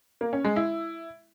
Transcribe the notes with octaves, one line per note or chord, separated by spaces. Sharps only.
A#3
C#4
G#3
E4